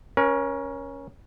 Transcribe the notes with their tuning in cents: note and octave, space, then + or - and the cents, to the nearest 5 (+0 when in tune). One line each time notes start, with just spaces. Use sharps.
C#4 +0 A#4 +35